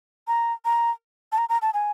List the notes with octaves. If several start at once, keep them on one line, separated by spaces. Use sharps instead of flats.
A#5
A#5
A5
A#5
A#5
A5
G#5